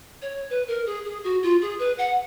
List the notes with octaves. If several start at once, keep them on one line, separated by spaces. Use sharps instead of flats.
C#5
B4
A#4
G#4
G#4
F#4
F4
G#4
B4
F#5